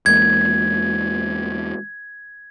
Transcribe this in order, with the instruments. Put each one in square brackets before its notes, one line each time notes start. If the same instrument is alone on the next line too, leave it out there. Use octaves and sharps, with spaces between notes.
[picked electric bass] E2 G#3 A#3 [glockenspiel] G#6